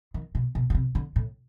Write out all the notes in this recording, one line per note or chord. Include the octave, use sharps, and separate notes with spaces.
D#3
B2
B2
B2
C3
D3
A2